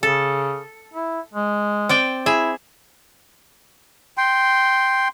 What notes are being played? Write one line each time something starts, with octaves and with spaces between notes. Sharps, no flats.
C#3 A4
E4
G#3
C4 D5 G5
E4 G#4 E5
G5 C6